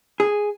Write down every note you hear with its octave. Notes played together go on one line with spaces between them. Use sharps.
G#4